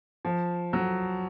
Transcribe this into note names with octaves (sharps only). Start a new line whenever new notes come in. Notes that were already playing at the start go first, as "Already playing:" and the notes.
F3
F#3